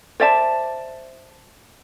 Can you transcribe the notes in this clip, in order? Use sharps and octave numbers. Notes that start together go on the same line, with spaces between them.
C5 D5 E5 A5